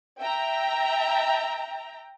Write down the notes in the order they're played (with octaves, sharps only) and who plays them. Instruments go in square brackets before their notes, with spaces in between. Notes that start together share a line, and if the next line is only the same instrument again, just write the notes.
[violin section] E5 G5 A#5